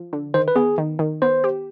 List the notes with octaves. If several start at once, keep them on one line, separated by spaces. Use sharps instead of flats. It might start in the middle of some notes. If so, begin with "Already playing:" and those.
Already playing: F3
D3
D#3 C5
B4
B3 G#4
D#3
D#3
B3 C5
G4